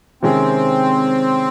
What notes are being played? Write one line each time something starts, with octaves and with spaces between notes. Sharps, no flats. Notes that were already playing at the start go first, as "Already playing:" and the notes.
C3 D#3 G#3 C4 C#4